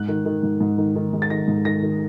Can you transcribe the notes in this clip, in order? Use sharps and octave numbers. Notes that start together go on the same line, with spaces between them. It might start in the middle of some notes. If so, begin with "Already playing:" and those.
Already playing: G#2 F#6
D#3
D#3
G#2
G#2
D#3
D#3
G#3
A6
D#3 A#6
G#2
D#3 A#6
D#3